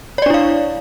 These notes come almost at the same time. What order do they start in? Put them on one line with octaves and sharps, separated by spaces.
C#5 D5 D4 E4 F5